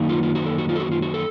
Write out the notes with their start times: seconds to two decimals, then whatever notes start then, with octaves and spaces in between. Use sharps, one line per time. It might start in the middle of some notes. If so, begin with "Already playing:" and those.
Already playing: F#2 D#3 A#3 D#4
0.09 F4
0.23 F4
0.35 F#4
0.46 A4
0.58 F#4
0.69 F4
0.75 A4
0.80 F#4
0.91 F4
1.02 F#4
1.14 A4